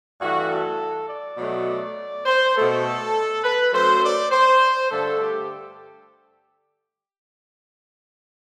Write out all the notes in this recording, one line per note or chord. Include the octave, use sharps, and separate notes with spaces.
G2 E3 A3 F#4
A4
D5
B2 F#3 A3
D5
C5
B2 A3 A4
B4
F#2 F#3 A3 C5
D5
C5
G2 D3 A3 A4
G4